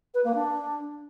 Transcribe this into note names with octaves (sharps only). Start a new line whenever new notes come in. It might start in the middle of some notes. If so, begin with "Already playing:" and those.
B4
A#3
D4